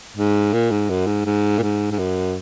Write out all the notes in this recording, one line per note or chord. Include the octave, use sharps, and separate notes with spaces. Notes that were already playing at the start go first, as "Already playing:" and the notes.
G#2
A#2
G#2
F#2
G#2
G#2
A#2
G#2
G#2
F#2